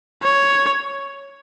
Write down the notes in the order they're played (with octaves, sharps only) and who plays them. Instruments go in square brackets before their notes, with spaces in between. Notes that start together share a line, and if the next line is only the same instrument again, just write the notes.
[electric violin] C#5